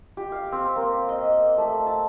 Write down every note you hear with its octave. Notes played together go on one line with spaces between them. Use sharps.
G4
F5
C4
A#3
D#5
A3
A5